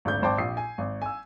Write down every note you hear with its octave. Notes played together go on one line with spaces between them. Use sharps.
G#1 D2 G6
G#1 C5 G5 A5 D6
A#1 G4 D#6 C7
G#5
G#1
G#5 E6